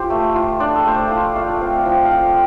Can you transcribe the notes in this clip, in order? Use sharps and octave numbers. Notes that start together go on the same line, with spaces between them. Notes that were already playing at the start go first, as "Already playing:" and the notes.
Already playing: F4 G4 C5
A3
F4
D4 D5
A4
A3 C5
D5
F4 F5
A3 F5
D5
C4 F5
F3 G5
F5
F4 G5